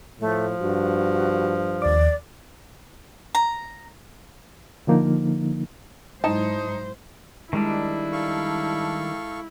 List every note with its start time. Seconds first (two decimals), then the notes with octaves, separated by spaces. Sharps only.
0.20 A2 F3 A3
0.60 G2 F#4
1.82 D#2 D5 D6
3.35 A#5
4.87 D3 F3 A#3 D#4
6.24 G#2 F#3 D#4 E4 C5 A5
7.53 D#3 G3 G#3 D4 E4
8.12 A4 F5 C#6